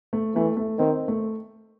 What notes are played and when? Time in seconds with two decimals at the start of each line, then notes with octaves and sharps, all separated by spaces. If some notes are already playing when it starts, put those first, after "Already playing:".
0.13 A3
0.35 E3 A3
0.57 A3
0.79 D#3 C4
1.08 A3